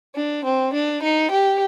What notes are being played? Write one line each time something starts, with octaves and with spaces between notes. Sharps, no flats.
D4
C4
D4
D#4
G4